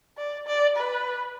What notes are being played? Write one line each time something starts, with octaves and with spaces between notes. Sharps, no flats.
D5
D5
B4